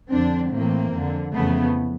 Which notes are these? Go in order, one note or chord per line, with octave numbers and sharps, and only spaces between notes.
F2 D3 C4 D4
A2 E3 A#3 C4
F2 D3
F2 C#3 E3 A3 B3